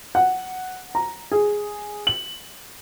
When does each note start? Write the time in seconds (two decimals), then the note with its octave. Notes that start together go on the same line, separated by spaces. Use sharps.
0.15 F#5
0.95 A#5
1.32 G#4
2.07 F#7